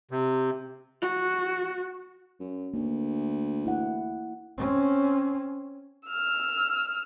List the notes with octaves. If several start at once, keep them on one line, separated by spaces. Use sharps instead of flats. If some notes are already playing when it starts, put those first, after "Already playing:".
C3
F#4
F#2
D2 A#3
E4 F#5
C4 C#4
E6 F6